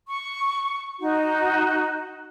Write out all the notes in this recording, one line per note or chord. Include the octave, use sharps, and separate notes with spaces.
C#6
D#4 F#4